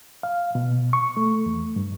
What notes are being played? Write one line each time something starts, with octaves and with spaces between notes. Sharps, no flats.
F5
B2
C#6
A3
E2
G2